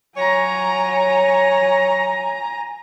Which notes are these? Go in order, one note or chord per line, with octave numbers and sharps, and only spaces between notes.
F#3 C#5 G#5 A#5